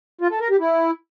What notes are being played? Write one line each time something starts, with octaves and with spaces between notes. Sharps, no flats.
F4
A4
A#4
G4
E4